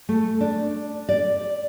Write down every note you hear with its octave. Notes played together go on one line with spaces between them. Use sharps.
A3
D4
D5